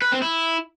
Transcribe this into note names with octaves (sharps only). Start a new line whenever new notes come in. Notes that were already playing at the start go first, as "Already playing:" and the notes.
B4
C4
E4